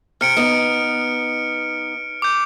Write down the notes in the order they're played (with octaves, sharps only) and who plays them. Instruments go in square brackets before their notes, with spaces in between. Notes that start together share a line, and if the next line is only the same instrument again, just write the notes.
[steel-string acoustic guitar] C3 [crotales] F6 C#7 D7
[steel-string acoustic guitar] B3 D#4
[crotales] D6 G6